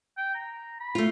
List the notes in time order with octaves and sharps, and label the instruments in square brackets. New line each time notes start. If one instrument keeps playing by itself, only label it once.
[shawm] G5
A#5
B5
[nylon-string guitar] A3 F4